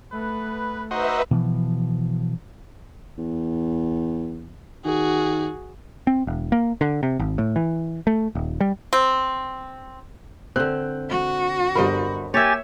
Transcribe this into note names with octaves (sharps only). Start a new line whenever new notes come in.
A3 B3 B4
D#4 F#4 B4 C5 D#5 E5
B2 E3 F3
E2
D#3 F#4 G#4
C4
E1
A#3
D3
C3
G#1
A2
E3
A3
D#1
G3
C4
D3 C4 F#6 G6
F#4
G1 G3 A#4 C5 D#5 B5
A#3 G4 C#5 E5 G#5 A6